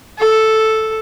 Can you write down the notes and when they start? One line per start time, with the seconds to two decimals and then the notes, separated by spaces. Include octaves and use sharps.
0.19 A4